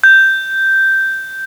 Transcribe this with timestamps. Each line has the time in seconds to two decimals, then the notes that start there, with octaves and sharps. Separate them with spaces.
0.04 G6